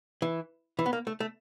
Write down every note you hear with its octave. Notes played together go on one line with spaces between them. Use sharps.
E3
E3
B3
A#3
A3
A3